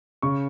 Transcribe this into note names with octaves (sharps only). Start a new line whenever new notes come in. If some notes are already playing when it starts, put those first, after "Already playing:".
C#3 C#6